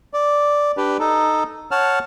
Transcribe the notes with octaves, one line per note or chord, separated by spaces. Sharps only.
D5
D4 G4 B4
D#4 A4
C#5 F#5 A5 F6